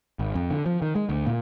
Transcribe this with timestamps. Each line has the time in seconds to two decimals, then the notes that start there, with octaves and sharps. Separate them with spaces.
0.19 G#1
0.35 F2
0.51 D3
0.66 F3
0.82 D#3
0.95 G#3
1.09 D2
1.27 A#2